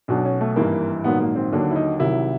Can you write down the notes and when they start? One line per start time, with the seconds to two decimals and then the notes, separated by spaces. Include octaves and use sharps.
0.08 B1 B2 F#3 D4
0.25 C#4
0.41 A3
0.56 G#1 G2 E3 A#3
1.04 A#1 G#2 D#3 F#3 B3
1.20 A#3
1.36 C4
1.52 D#2 D3 F#3 D4
1.71 E4
1.76 D#4
2.00 C2 C3 D#3 F#3 E4